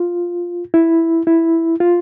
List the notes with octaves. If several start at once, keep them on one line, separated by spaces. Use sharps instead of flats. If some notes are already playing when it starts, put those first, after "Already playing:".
Already playing: F4
E4
E4
F4